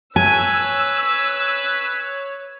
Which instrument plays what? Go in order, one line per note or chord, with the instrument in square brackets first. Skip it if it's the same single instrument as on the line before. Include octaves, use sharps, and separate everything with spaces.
[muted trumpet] B4 [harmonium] C#5 [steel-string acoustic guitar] G#5 [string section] E6